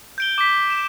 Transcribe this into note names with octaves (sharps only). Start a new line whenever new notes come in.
G6 D7 G7
D6 B6
E7